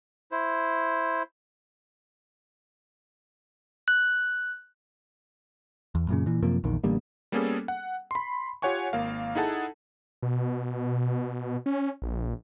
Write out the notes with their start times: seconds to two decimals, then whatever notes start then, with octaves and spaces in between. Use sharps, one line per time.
0.32 E4 C5
3.88 F#6
5.95 E2
6.08 F#2 A#2 C#3
6.26 A#2 E3
6.42 F#2 C3 F3 A#3
6.64 A#1 E2 D#3
6.84 A1 D3 G3 A#3
7.32 G3 A#3 B3 C#4 G#4 A4
7.68 F#5
8.11 B5 C6
8.62 F4 G4 C#5 F#5 G#5 C#6
8.93 G#1 A#3 A#4 F5
9.35 D#4 E4 G#4 A4 F#5 A5
10.22 B2
11.66 C#4
12.02 A#1